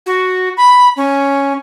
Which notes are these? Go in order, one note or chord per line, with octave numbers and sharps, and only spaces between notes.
F#4
B5
C#4